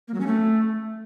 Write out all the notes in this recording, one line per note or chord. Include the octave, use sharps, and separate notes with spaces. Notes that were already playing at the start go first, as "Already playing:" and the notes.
A#3
F#3
C#4
A3